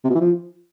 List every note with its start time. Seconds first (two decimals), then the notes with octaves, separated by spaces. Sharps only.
0.04 C3
0.10 B2
0.15 E3
0.20 F3